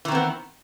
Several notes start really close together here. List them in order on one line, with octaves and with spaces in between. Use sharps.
E3 D#3 C4 B3